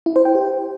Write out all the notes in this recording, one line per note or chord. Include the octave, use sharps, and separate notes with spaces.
E4
C5
G5
G4